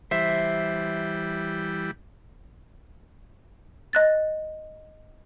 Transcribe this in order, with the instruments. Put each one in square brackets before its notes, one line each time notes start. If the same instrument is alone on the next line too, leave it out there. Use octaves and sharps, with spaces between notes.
[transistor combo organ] E3 G3 [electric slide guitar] C5 E5
[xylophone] D#5 F#6 A6